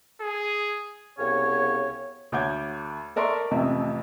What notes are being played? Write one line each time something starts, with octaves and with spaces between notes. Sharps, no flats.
G#4
C2 C#3 B3 C#5
D2 C#5 F#5 D6 G6 G#6
A4 A#4 D5 E5 C6 C#6
A1 F2 C3 A3 E5